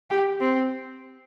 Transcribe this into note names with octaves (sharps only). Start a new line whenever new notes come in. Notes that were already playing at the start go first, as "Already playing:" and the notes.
G4
C4